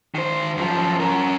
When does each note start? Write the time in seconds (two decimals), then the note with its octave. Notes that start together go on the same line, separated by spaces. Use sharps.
0.15 D#3 C5
0.57 F#2 F3
1.00 C#4 A#4